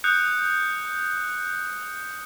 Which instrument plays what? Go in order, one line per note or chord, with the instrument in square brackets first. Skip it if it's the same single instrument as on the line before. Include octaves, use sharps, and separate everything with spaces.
[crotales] D#6 F#6 G6 C#7